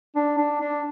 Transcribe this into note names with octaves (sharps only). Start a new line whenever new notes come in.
D4
D4
D4